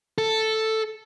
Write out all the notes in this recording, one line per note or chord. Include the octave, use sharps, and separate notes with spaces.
A4